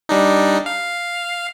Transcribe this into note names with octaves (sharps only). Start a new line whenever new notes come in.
G3 D4 D#4
F5